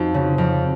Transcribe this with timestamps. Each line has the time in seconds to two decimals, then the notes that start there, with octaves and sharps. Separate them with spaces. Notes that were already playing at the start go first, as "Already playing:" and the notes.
Already playing: F2 D#4 F#4
0.14 C#3
0.38 F2